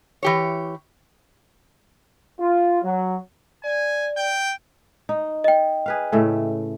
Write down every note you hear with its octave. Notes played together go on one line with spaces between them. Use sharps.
E3 G4 C#5
F4
F#3
D5 G#5
G5
D#4
D#5 G5
G#4 B4 F5
A2 C#3 A3